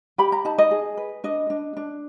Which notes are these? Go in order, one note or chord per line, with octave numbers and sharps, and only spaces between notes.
G4 B5
A#5
D#4 A5
D#5
G#4
B4
D4 D#5
D4
D4